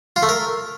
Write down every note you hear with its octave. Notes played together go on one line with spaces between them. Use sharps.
F4
A3
A#4